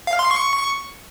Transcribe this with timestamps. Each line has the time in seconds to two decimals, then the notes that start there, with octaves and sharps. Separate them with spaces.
0.07 F5
0.19 C6
0.31 C#6